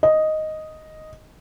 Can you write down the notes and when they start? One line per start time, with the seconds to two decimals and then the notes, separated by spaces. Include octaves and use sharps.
0.03 D#5